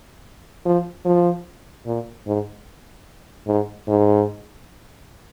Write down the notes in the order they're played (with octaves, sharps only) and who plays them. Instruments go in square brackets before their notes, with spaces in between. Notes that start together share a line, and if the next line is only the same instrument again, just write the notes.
[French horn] F3
F3
A#2
G#2
G#2
G#2